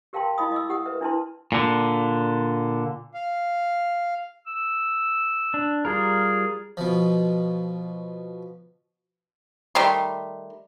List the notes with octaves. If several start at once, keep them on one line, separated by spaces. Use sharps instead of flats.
G4 A#4 F5 G5 A5 C6
D#4 E4 D#5 F5 B5 D#6
D#5 D6 E6
G4 F#5 D#6 E6
A#4 B4 E5
D4 E4 B4 A5 C6
A#2 D3
F5
E6
D4
G3 F4 G#4 A#4
B2 F3
D#3 G3 A3 C6